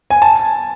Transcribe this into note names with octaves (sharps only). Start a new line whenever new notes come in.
G#5
A5